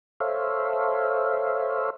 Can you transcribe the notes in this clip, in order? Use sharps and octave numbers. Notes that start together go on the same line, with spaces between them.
A4 C5 C#5 E5 F5